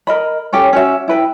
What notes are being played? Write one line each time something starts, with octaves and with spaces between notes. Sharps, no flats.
A#4 D#5 B5
C#4 G4 A4 C#5
C#4 F#4 E5
E4 B4 G5